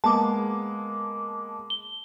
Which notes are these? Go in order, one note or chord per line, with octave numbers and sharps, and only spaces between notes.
G#3 A#3 B3 A5 D6
G7